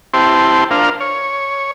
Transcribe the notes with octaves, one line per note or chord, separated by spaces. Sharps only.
C4 E4 G4 C5 A5 C6
D4 F4 A#4 C5 F5
C#5